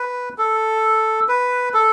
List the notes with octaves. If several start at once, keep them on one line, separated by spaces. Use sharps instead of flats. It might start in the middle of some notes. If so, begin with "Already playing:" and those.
Already playing: B4
A4
B4
A4